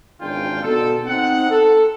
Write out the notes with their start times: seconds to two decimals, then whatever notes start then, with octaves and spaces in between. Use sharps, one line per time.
0.20 G#1 C#3 E3 D4 F4 G5
0.63 B2 D3 D#4 A4
1.07 C4 D#4 F#5
1.49 A4